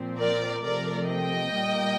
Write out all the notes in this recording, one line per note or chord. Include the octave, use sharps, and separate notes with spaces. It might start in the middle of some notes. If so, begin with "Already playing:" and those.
Already playing: A#2 F3 C4
A#4 D5
C3 F3 A3 A#4 D5
D#5 G5
A#2 G3 A#3